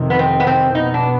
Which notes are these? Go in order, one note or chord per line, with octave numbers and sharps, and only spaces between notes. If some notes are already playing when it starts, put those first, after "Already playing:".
Already playing: F2 C3 D#3
B3
C4
B3
C4
B2 B3 D#4
D4